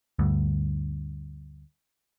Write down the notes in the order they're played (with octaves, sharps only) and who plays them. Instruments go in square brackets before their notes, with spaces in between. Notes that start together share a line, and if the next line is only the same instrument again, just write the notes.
[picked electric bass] D2 G2